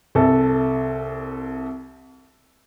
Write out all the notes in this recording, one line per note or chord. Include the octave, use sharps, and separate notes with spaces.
C2 A4